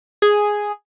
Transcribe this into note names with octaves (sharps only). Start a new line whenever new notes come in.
G#4